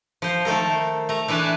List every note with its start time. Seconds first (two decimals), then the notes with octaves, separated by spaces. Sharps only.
0.22 F3 C5
0.45 D#3 A3 A4 A#4
1.09 A3 A#5
1.28 E3 D4 B4 G#5 A5